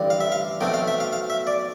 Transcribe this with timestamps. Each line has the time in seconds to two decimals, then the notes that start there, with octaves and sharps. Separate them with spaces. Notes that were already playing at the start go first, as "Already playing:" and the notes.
Already playing: A1 G2 D3 G3 C4
0.10 F5
0.21 E5
0.32 F5
0.61 B1 B2 A3 C4 G5
0.74 F5
0.88 E5
1.00 F5
1.13 F5
1.30 E5
1.47 D5